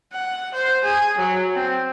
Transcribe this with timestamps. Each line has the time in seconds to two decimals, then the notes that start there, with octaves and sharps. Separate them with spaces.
0.12 F#5
0.54 C5
0.84 G#4
1.18 F#3
1.54 C4